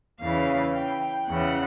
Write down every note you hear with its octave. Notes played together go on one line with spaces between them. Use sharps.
E2 C#3 E3 F5
G5
E2 C#3 E3 F#5